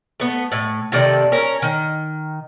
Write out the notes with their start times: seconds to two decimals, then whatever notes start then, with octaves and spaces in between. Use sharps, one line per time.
0.20 A3 B3
0.52 A2
0.92 C3 D#3 A4 D5
1.32 C#4 A#4
1.62 D#3